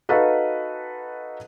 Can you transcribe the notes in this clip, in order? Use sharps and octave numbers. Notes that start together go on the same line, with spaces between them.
D#4 F#4 A4 B4 F5